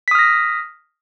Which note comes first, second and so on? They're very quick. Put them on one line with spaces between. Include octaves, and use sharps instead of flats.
B6 D#6 F6 A#6